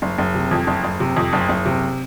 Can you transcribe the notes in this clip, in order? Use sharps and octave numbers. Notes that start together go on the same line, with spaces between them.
F#1
F#1
C3
F2
F#1
F#1
C3
F2
F#1
F#1
C3